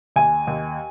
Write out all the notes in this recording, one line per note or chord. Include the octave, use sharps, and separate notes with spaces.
D#2 G#5
D#2